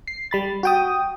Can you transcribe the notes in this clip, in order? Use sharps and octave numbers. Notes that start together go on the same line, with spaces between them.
C7
G3 B5 A6
F#4 G5 D#6